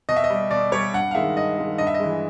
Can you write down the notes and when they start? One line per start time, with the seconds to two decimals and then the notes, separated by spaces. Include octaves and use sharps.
0.09 B2 D#5
0.16 E5
0.24 D#5
0.30 G3
0.51 B2 D5
0.72 G3 C#5
0.94 G2 F#5
1.11 F5
1.15 D#3 G#3 E5
1.36 G2 D#5
1.58 D#3 G#3
1.78 G2 D#5
1.87 E5
1.94 D#5
2.00 E3 G#3